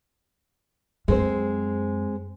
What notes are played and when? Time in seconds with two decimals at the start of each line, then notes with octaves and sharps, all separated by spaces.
1.08 F#2 G#3 C4 C5